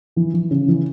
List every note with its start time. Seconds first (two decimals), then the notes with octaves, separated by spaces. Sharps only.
0.16 E3
0.34 E3
0.51 C#3
0.68 E3